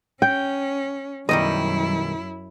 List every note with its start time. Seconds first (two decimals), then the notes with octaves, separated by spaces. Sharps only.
0.22 C#4 G5
1.29 B1 F#2 D#3 G3 E4 D#5